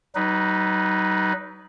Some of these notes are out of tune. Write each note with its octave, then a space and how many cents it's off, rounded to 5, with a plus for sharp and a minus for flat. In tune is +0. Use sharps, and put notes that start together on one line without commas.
F#3 +45 D#4 +0 B4 +0